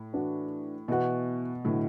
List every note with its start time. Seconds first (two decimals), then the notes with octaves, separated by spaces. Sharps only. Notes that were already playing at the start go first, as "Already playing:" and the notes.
Already playing: A2
0.13 E3 D4 F#4
0.88 B2 E3 B3 F#4
1.64 A2 D3 F#3 B3 E4